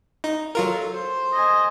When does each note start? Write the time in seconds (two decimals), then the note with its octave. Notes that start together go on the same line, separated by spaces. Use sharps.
0.24 D#4
0.55 F#3 F4 A4 A#4
0.94 C5
1.33 D#5 G#5